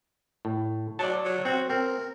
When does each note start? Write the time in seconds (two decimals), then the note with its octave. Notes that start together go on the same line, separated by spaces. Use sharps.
0.45 A2
0.99 F#3 D5 A5
1.25 F#3
1.45 C4 F#4
1.70 C4 A#4